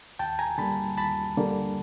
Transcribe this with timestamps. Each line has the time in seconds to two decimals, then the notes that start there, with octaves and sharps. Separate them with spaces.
0.19 D#2 G5 A5
0.39 G#5 A#5
0.58 D3 G3 A#3 A5 B5
0.97 D#2 A5 B5
1.37 D3 G3 A#3